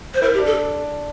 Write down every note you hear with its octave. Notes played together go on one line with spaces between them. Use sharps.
C5
E4 A#4
G4
D4
A4